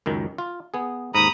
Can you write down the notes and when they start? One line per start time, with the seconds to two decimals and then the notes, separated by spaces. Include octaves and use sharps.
0.06 C#2 F#2 D#3
0.38 F4
0.74 B3 G#4
1.14 D#2 G#2 A#5 B5 D#6